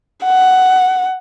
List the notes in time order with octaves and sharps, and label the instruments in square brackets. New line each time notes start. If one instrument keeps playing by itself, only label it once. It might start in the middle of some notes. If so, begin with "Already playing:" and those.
[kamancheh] F#5